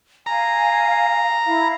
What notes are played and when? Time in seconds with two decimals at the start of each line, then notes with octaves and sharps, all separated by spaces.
0.26 F5 G#5 A#5
1.46 E4 F5